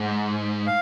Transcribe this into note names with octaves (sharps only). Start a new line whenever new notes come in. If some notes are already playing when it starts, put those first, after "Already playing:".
Already playing: G#2
F5